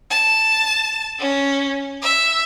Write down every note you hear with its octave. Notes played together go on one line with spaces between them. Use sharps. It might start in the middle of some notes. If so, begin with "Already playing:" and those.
A5
C#4
E5